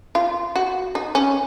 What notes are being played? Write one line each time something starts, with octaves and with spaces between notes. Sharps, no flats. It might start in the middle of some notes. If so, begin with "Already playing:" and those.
F4
F#4
D#4
C#4